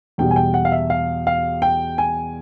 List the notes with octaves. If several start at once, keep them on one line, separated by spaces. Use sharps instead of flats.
E2 B2 G3 G5
G#5
G5
F#5
F5
E5
F5
F5
G5
G#5